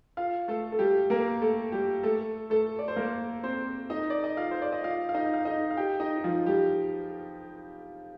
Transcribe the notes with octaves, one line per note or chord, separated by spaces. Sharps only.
F4 F5
A3 A4
A4
G3 G4
A#3 A#4
A3 A4
G3 G4
A3 A4
A3 A4
D5
C5
A#3 A#4
C4 C5
D#4 D#5
D5
D#5
F4 F5
C5
D5
D#5
F4 F5
F5
D#4 D#5
F5
D#4 D#5
F5
G4 G5
D#4 D#5
D#4
F3 F4
G3 G4